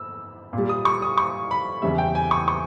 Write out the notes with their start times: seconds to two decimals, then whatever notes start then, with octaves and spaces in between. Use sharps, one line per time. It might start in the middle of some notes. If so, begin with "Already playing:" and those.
Already playing: E6
0.53 A#2
0.58 G3
0.69 D#6
0.85 C#6
1.02 D#6
1.17 C#6
1.51 B5
1.82 E2 C#3 G3 E5
1.98 G5
2.15 G#5
2.31 C#6
2.48 C#6